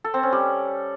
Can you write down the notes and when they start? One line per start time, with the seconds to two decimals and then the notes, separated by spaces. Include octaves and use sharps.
0.04 A4
0.14 C4
0.23 C#4
0.32 G3